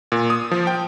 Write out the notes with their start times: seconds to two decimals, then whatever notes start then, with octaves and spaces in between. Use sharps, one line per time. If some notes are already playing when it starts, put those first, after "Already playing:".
0.12 A#2
0.30 D#6
0.51 F3
0.67 G5